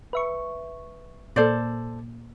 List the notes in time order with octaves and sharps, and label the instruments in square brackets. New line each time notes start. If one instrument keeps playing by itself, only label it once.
[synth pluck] B4 E5 C#6
[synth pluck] A#2 A#3 [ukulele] A4 C5 D5